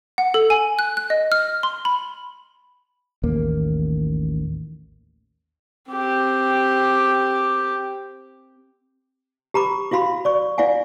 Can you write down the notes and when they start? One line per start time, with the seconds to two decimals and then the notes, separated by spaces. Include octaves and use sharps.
0.18 F#5
0.34 A4
0.50 G#5
0.79 F#6
0.97 F#6
1.10 D#5
1.32 F6
1.63 C6
1.85 B5
3.23 A1 D#2 A#3
5.91 C4 G4
9.54 G4 A#5 B5 D6
9.91 E4 F#4 F5 B5 C6
10.25 D5 C#6
10.58 E4 D5 F5 F#5 G#5